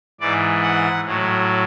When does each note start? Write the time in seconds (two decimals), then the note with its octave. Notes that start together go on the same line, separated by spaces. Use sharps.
0.20 G#2 E3 D5
0.63 F#5
1.05 A2 F#3